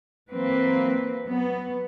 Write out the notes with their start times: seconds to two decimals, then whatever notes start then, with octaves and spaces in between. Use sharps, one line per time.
0.30 E3 F#3 A#3 C4 B4
1.26 F#3 B3